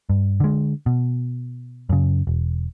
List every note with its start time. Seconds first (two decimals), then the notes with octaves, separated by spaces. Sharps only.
0.10 G2
0.40 D3 G#3
0.86 B2
1.89 F#2 C#3
2.27 E1